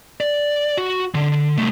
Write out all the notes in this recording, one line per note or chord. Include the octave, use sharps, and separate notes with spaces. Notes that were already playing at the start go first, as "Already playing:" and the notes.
D5
F#4
D3
C2 A3